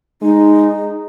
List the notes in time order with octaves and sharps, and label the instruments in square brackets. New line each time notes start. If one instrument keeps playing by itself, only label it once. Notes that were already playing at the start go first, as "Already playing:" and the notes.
[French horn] G#3 [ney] D#4